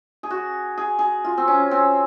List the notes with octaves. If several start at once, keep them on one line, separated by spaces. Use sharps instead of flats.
G#4
F#4
G#4
G#4
F4
C4
C#4
C4